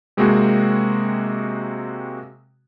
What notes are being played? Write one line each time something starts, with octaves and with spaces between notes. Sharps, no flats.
C3 G#3 A#3 C4 F#4 G#4